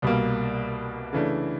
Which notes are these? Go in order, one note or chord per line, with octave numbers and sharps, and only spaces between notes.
C2 B2 G3 A#3
C#3 E3 A3 D4